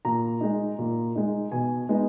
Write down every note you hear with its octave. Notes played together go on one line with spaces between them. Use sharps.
A#2 A#5
G#3 D#4
A#2
G#3 D#4
B2 G#5
G#3 B3 D#4